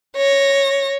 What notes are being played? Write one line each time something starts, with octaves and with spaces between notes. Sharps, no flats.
C#5 A#6